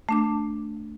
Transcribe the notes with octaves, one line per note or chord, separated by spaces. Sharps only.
A3 D4 D6